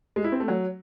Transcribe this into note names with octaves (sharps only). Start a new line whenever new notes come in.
G#3
E4
C4
A3
F#3